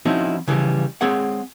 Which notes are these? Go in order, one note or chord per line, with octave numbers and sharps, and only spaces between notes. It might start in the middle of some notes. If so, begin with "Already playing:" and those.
F3 C4 C#4 D#4 E4 F#4
C#3 E3 F3 G3
G#3 C4 G#4 C#5 F#5